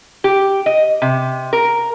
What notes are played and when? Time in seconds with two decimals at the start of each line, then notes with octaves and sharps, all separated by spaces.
0.24 G4
0.66 D#5
1.02 C3
1.53 A#4